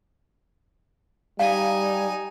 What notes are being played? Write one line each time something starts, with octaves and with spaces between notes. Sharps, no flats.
G3 D#4 F5 G#5